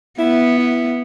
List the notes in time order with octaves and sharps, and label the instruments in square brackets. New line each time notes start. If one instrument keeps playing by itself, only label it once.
[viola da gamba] B3 [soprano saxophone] E4
[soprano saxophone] E4